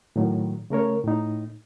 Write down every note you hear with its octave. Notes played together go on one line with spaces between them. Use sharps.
A2 D#3 F#3
C#3 A3 A#4 C#5
A2 D#4